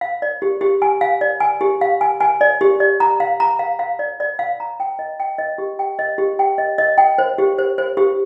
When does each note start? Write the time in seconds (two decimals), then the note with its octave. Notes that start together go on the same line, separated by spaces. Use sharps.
0.01 F5
0.22 D5
0.42 G4
0.61 G4
0.82 G#5
1.01 F5
1.21 D5
1.40 G#5
1.61 G4
1.81 F5
2.01 G#5
2.20 G#5
2.41 D5
2.61 G4
2.80 D5
3.00 A#5
3.20 F5
3.40 A#5
3.59 F5
3.79 F5
3.99 D5
4.20 D5
4.39 F5
4.60 A#5
4.80 G5
4.99 D#5
5.20 G5
5.38 D#5
5.58 G4
5.79 G5
5.99 D#5
6.18 G4
6.39 G5
6.58 D#5
6.78 D#5
6.98 G5
7.18 C5
7.38 G4
7.59 C5
7.78 C5
7.97 G4